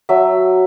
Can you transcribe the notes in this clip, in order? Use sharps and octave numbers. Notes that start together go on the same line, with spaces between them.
F#3 E5